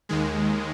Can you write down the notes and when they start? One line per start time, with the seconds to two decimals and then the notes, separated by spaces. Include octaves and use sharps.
0.09 D#2 D#3 G#3